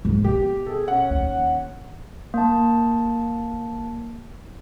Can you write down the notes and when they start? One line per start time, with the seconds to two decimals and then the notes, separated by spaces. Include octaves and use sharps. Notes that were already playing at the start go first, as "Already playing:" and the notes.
0.05 G#2 D3
0.24 B2 G4
0.66 G#4 A4
0.88 C#4 F#5
1.11 D#2
2.34 A#3 A5